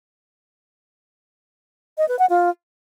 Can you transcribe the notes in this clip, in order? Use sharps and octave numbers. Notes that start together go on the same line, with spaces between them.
D#5
B4
F#5
F4